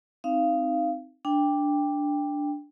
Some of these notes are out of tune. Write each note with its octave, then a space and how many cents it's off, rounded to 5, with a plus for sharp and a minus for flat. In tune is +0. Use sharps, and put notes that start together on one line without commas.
C4 +0 D#4 +0 F5 -20
D4 +0 G5 +15